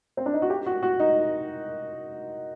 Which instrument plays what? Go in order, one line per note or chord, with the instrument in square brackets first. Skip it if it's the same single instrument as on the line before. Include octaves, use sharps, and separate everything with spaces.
[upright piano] C4
D4
D#4
F#4
G4
F#4
F#4
D#4